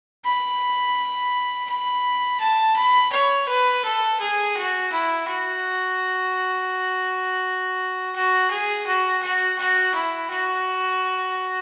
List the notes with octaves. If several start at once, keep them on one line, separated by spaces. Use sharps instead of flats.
B5
B5
A5
B5
C#5
B4
A4
G#4
F#4
E4
F#4
F#4
G#4
F#4
F#4
F#4
E4
F#4